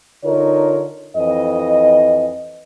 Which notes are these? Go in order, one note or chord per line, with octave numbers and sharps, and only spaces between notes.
D3 D#4 F4 A#4 C#5
F2 E3 D#5